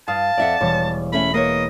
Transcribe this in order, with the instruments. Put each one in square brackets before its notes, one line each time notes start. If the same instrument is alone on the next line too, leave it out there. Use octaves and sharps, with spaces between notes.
[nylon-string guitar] G2 [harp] F5 D#6 [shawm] A5
[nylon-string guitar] F2 E5 F#5 [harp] D5
[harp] E1 G3 [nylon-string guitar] C#5
[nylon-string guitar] A3 C#4 E5 [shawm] B5
[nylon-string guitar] A#3 B4 C#5 [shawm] D#5